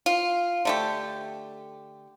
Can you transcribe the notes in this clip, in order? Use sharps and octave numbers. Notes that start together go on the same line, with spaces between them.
F4
D3 A3 G4